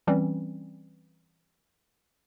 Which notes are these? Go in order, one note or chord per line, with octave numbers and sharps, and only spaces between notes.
E3 G3 C4 C#4